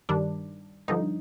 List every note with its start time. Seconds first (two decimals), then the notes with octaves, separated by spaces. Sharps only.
0.09 G2 D#3 G3 D4
0.88 G2 D3 F3 D#4